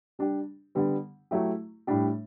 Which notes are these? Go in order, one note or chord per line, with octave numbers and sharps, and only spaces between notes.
G3 D4 G4
D3 G3 B3
F#3 A3 E4 G4
A2 G3 D4 G4